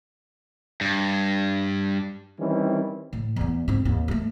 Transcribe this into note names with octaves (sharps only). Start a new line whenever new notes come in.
G2
D#3 E3 G3 C4 C#4
A2
E2 B3
G#2 C4
D#2
G#3 A3